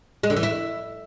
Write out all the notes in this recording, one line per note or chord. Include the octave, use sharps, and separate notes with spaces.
G#3
D3
E3
E4